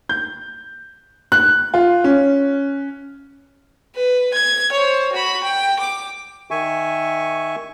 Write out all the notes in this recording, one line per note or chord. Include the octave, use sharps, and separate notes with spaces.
G6
F#6
F4
C#4
B4
G#6
C5 C#5
F#4 B5
G5
D6
D#3 E5 G#5 C#6